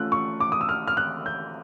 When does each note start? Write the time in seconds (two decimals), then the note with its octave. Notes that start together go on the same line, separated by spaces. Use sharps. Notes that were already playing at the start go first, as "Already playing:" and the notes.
Already playing: A3 C#4 F4 E6 F#6
0.12 C#6
0.40 D6
0.52 D#6
0.61 E6
0.69 F6
0.87 F6
0.97 F#6
1.26 G6